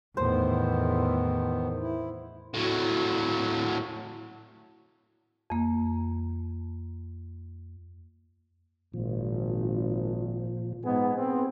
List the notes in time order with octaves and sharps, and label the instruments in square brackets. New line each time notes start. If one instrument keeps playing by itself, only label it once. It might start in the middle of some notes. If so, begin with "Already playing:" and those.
[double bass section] E2 A2 [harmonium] D#3 B3 [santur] C5
[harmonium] E4
[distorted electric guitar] A2 F#3
[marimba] F2 A#3
[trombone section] G#1 [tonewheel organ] A#2 F3
[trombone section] G#2 B3 [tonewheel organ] G#4
[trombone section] B3 C4